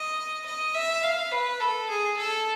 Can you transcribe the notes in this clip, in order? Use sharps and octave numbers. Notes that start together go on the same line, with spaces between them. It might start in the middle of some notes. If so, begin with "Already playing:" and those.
Already playing: D#5
D#5
E5
F5
B4
A4
G#4
A4